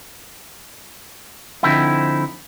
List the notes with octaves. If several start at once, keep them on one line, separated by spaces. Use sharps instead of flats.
D3 F3 C4 D#4 E4